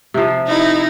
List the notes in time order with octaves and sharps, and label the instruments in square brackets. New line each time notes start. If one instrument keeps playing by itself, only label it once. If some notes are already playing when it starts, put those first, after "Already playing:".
[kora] C3 F3
[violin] D#4 E4